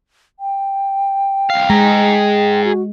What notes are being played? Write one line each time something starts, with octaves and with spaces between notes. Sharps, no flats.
G5
C2 F5
G#3 G#4 A#5
F#4